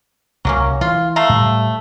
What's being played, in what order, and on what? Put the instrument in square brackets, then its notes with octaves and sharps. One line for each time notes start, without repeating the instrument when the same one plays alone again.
[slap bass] C2 [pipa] F#3 A#3 C#4
[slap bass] E3 [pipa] F4
[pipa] A3 F5 A#5
[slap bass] A2 G3